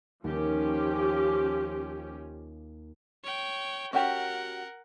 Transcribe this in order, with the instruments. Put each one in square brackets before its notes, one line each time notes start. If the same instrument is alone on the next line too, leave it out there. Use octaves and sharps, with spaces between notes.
[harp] D#2 [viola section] F3 C#4 G4
[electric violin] C#5 G5
[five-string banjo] C#4 F#4 G4 [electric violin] A#4 F#5